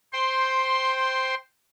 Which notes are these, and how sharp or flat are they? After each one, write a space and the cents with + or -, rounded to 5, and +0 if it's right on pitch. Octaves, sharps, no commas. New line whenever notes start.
C5 +0 G5 +0 C6 +10